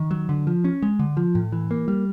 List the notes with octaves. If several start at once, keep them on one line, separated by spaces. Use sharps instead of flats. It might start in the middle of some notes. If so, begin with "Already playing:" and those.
Already playing: D#3
F#3
D3
F3
C#4
G#3
D3
F3
A2
E3
A#3
G3